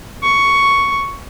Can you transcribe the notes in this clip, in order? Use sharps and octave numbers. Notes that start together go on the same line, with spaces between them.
C#6